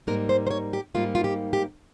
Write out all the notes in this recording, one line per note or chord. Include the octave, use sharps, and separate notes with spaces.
G#2 G3 A#3 D#4 A#4
C5
C5
C#5
G4
G#2 G3 A#3 D#4 F4
F4
G4
G4